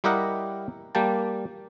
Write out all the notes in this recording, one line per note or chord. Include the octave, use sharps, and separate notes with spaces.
G3 E4 G4 A#4 D#5 F#5
G3 A#3 G5 A5